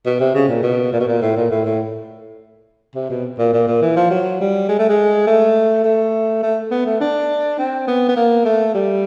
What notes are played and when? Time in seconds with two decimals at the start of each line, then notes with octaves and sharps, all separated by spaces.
0.06 B2
0.20 C3
0.35 C#3
0.49 A#2
0.63 B2
0.93 A#2
1.00 B2
1.08 A#2
1.22 A2
1.36 A#2
1.51 A2
1.65 A2
2.95 C3
3.10 B2
3.39 A#2
3.53 A#2
3.68 A#2
3.82 E3
3.97 F3
4.10 F#3
4.41 G3
4.69 G#3
4.79 A3
4.89 G#3
5.27 A3
5.84 A3
6.43 A3
6.71 B3
6.86 A3
7.01 D4
7.59 C4
7.88 B3
8.08 B3
8.16 A#3
8.45 A3
8.74 G3